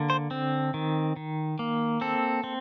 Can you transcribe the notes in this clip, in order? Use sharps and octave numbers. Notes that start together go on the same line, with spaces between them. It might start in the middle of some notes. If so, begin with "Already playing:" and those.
Already playing: D3 A#3
C5
C4
D#3
D#3
A#3
C4 A4
C4